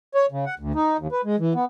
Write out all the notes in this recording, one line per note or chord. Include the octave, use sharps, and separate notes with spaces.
C#5
C#3
F#5
D2
D#4
D#2
B4
G#3
E3
B3